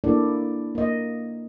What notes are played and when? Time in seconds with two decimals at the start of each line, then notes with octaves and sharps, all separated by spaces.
0.04 A#3 D4 E4 A4 D5
0.75 A#3 D#5